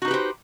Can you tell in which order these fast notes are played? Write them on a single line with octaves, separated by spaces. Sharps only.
F#4 D#4 B4 G4 C5